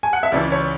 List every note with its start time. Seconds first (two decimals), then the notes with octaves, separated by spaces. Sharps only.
0.03 G#5
0.13 F#5
0.23 E5
0.32 C#2 C#3 E3 D5
0.52 C#5